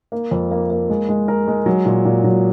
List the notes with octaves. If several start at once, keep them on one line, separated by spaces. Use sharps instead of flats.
A#3
F2
A#3
A#3
G#3
G#3
A#4
G#3
F#3
A#2
A#2
F#3